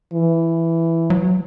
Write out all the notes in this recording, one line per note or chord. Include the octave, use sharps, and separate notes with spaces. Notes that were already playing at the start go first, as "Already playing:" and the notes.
E3
F#3